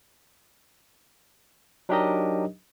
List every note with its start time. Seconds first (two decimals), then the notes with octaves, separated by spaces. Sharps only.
1.89 F#3 D4 D#4 G4 A#4 D#5